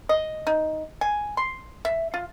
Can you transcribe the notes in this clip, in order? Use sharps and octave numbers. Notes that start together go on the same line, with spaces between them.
D#5
D#4
G#5
C6
E5
F4